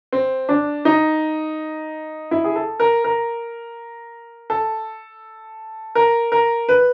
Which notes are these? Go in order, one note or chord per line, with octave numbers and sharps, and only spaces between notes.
C4
D4
D#4
E4
G#4
A4
A#4
A#4
A4
A#4
A#4
B4